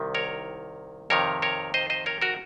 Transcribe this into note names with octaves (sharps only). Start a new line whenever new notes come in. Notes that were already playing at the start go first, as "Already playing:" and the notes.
Already playing: C2 C3 D#3
A#4 C#5
F2 C3 D#3 A#4 C#5
A#4 C#5
C5 D#5
C5 D#5
A#4 C#5
F#4 A#4